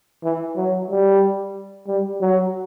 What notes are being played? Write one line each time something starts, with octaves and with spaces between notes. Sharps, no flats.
E3
F#3
G3
G3
F#3